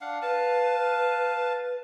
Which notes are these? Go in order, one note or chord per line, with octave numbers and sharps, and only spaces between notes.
D4 F5 F#5
B4 F5 A5